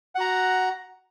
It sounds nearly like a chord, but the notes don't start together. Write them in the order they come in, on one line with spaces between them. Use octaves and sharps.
F#5 F#4 A#5